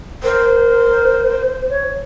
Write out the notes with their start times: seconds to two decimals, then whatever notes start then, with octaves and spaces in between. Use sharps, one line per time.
0.23 A#4 C5
1.69 C#5